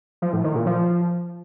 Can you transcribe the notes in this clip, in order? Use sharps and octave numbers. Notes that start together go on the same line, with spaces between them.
F3
A2
D#3
A#2
F3